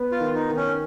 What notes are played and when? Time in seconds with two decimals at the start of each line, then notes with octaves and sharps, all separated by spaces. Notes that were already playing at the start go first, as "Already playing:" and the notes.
Already playing: B3
0.12 F4
0.20 D#3
0.35 D#4
0.50 D#3
0.57 C#4